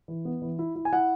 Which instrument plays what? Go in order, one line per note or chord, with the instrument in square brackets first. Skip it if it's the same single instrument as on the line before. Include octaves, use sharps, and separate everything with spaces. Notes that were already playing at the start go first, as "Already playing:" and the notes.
[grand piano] E3
B3
E3
E4
E4
G#5
E4 F#5